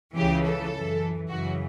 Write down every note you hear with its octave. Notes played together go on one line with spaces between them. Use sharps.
C#2 C#3 E3 G4
A4
F#2 E3
F#2 C#3 E3 F#4